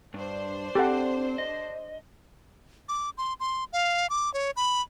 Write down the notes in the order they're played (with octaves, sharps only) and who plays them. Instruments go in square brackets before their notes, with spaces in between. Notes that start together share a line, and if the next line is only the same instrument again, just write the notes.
[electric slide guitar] G2 [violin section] D4 C5
[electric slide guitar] C4 [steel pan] G4 A4 F#5
[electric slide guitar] D#5
[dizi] D6
C6
C6
F5
D6
C#5
B5